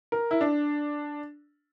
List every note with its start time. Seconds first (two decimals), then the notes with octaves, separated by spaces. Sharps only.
0.12 A#4
0.31 E4
0.41 D4